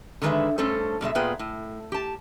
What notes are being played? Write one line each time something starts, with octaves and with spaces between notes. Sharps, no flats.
D3 D#3 G#3 G#4 B4 E5
G2 A3 C#4 A4 C5
G2 B2 G#3 E5
A#2 B3 F4 G#4 B4 G5
A2
G4 A5